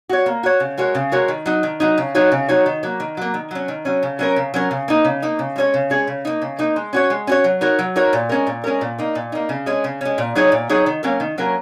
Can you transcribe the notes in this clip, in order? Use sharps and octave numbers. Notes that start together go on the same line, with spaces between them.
F#4 C#5
A#3
F#4 C#5
C#3
G#3 F#4 A#4 C#5
C#3
G#3 F#4 A#4 C#5
D#3
F#3 D#4
D#3
F#3 D#4
C#3
F#3 D#4 F#4 C#5
C#3
F#3 D#4 F#4 C#5
D#3
F#3 A#3
D#3
F#3 A#3
D#3
F#3 C#4
D#3
F#3 C#4
C#3
F#3 C#4 A#4
C#3
F#3 C#4 A#4
C#3
A#3 D#4
C#3
A#3 D#4
C#3
G#3 C#4 G#4 C#5
C#3
G#3 C#4 G#4 C#5
C#3
A#3 D#4
C#3
A#3 D#4
G#3
C#4 F#4 C#5
G#3
C#4 F#4 C#5
F#3
D#4 F#4 A#4 C#5
F#3
D#4 F#4 A#4 C#5
A#2
G#3 C#4 A#4
A#2
G#3 C#4 A#4
A#2
A#3 D#4
A#2
A#3 D#4
C#3
G#3 C#4
C#3
G#3 C#4
A#2
F#3 D#4 G#4 C#5
A#2
F#3 D#4 G#4 C#5
D#3
F#3 A#3 C#4 A#4
D#3
F#3 A#3 C#4 A#4